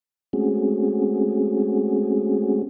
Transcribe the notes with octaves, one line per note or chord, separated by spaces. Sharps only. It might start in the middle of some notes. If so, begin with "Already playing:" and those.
G#3 A3 C4 C#4 F#4 G#4